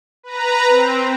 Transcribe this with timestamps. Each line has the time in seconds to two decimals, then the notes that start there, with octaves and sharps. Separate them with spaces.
0.23 B4 A#5
0.69 C4